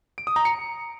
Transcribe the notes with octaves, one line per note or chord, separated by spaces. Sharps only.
D7
D#6
A#5
C#7